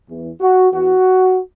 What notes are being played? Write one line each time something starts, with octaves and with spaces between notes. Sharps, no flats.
E2 E3
F#4
E2 E3 F#4